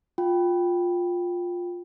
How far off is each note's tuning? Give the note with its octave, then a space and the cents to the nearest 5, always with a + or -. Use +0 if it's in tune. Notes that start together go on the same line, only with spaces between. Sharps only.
F4 +15 G5 +0